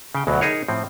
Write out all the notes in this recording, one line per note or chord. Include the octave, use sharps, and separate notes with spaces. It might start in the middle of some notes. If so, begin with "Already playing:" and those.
C#3 G5
D2 B2 F#3
D#4 G#4 A#4 C#5
A2 F3 C4